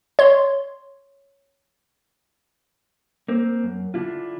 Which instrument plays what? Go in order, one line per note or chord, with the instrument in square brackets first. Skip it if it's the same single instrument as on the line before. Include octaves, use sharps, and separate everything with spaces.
[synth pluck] C#5 C6
[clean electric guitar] A#3 C4
F#2
D3 D4 E4 F4